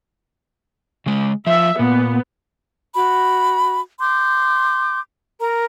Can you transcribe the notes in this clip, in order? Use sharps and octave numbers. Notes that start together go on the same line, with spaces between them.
C#3 G#3
F3 E5
A#2 B3
F#4 B5
C6 D6 G6
A#4 A#5